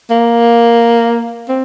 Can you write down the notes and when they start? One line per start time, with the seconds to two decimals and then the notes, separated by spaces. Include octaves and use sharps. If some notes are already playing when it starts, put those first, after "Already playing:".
0.10 A#3
1.49 C4